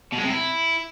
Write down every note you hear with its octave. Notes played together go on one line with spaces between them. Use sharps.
B2
G#3
C3
E4